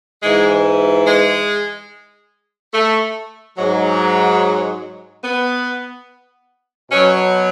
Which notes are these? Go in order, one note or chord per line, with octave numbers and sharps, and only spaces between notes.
G#2 E3 G#3
G#3
A3
G#2 F#3
B3
B2 F#3 C#4